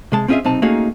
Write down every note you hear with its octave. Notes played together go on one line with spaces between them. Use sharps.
C3 G#3 A5
C4 C#4 F4 G#4 D#5 E5
B1 C3 C4 D#4 A5
A3 A#3 C#4 D#4 F#4 G#4